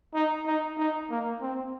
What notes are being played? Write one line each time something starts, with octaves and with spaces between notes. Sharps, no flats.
D#4
D#4
D#4
A#3
C4